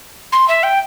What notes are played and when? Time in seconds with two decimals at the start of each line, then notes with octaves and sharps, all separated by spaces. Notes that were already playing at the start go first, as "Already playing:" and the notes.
0.32 C6
0.48 E5
0.63 G5